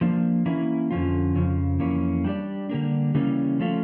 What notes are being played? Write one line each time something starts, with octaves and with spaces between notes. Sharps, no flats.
F3 A#3 D4
E3 A#3 C#4 E4
F2 D3 F3 C#4 F4
F2 C#3 F3
F2 E3 A#3 C#4
G3 D4 G4 D5
D3 G3 A#3 D4
C#3 E3 G3 A#3 C#4
F3 A3 C#4 F4